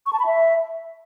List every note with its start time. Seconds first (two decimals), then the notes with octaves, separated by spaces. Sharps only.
0.06 C#6
0.13 A5
0.20 B5
0.26 E5